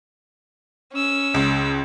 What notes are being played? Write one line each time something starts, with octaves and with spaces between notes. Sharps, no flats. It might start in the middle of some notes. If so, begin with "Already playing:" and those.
C#4 E6
C#2